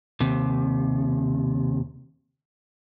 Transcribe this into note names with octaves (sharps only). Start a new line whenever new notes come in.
D#2 C3